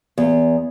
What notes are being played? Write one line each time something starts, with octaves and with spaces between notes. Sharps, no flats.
E2